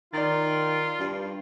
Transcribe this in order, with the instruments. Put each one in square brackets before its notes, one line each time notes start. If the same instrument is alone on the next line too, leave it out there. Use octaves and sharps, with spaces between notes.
[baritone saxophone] D#3 [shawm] F4 [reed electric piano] D5 A6
[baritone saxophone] G2